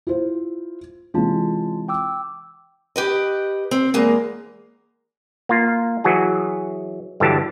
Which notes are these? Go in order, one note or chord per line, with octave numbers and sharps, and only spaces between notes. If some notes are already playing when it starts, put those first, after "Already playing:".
E4 F4 C5
C3 E3 G#3 C#4 F4 A5
G5 D6 E6
G4 B4 D#5
C4
E2 G#3 A#3
A#3 F4
E3 F#3 F#4 G#4
G2 D3 E3 F#3 G4 A5